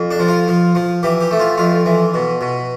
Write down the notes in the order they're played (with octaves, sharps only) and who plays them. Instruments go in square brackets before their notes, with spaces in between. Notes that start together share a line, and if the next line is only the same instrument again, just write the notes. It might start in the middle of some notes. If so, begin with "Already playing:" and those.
Already playing: [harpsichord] F2
D4
F3
F4
F3
F3
E3 G4
G4
A3
F4
F2 F4
E3
B2
B2